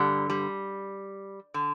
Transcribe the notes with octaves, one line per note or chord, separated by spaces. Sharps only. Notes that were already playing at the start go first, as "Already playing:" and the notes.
Already playing: G2 D3 G3
G3
D3